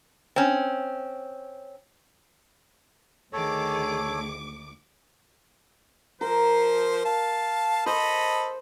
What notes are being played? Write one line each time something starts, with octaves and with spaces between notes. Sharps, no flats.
C4 C#4
D2 D#3 G#4 A4 C#5 D6
F3 A#4 C5
F5 A5
A4 C5 D#5 B5